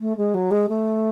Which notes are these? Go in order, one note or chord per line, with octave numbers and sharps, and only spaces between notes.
A3
G#3
F#3
G#3
A3